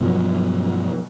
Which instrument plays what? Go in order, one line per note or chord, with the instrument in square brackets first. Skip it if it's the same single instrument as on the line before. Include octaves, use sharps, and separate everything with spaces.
[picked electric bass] G2 B2 F3 F#3